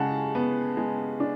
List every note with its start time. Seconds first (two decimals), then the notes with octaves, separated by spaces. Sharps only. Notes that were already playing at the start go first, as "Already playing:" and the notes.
Already playing: C#3 G#3 F#5 A5
0.35 B3
0.77 G#3
1.20 D4